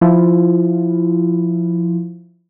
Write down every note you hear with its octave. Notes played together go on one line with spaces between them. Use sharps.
F3 E4 F4